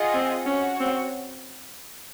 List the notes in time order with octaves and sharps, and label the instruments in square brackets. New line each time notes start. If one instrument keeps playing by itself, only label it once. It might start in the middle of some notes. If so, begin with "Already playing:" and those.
Already playing: [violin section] F4 G#4 D#5 F#5
[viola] C4
[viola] C#4 [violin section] F#4 C#5 F#5
[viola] C4